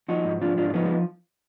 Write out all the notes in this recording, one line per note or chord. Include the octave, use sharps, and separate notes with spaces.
F3 D#4 F#4
G#2
F3 D4 F4
G#2 D4 F4
F4
F3 B3 D#4
G#3